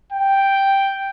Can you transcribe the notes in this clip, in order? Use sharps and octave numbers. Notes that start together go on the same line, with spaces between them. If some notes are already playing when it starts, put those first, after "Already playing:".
G5